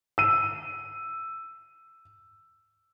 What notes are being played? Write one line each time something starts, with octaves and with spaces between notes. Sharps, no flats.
E6 D#7